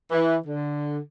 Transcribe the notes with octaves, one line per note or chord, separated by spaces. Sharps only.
E3
D3